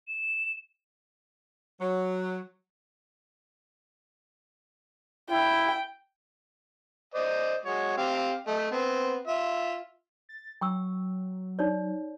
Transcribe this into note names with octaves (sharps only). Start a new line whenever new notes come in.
E7
F#3
E4 G5
C5 D5 D#5
G#3 F#4 C#5
C4 G4 F5
A3 D#5
B3 C4
F4 E5
A6
F#3 G5 C#6 E6
D#4 C#5 D5